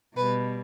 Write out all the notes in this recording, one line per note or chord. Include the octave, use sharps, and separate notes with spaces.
B2 G3 B4